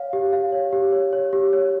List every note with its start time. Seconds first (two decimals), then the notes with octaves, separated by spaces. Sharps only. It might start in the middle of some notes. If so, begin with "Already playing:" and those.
Already playing: C#5 F5
0.13 G4
0.33 F5
0.52 C#5
0.73 G4
0.92 C#5
1.13 C#5
1.33 G4
1.53 C#5